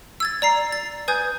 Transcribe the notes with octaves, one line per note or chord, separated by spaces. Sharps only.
E6 G#6 A6
D5 A#5 C7
A6
B4 G#5 D#6 G6 G#6